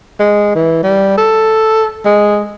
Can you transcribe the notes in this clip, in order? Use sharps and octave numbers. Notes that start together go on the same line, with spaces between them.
G#3
E3
G3
A4
G#3